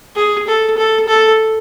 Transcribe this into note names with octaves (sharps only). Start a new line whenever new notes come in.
G#4
A4
A4
A4